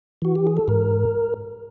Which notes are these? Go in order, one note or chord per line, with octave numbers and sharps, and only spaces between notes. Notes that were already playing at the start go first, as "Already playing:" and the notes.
E3 F#4
G4
G#4
A4
G#2 A#4